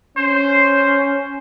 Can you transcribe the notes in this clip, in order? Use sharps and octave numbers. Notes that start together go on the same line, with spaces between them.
C#4 C5